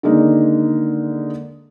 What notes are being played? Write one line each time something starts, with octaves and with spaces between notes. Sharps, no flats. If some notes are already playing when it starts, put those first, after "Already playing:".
D3 D#3 G#3 A#3 D#4